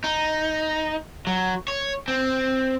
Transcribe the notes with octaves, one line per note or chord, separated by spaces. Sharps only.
D#4
F#3
C#5
C4